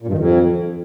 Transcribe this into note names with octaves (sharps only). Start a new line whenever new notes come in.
A#2
G2
D#3
F2